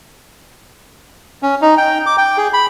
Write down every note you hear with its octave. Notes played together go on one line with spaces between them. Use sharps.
C#4
D#4
G5
D6
G5
G#4
B5